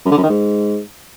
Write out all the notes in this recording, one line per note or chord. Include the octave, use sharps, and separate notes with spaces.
F#2
D3
F#2
D#3
G#2